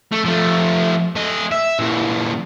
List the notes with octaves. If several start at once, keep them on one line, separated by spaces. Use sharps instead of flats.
A3
F3 A3
A3 D#5
E5
A#2 E3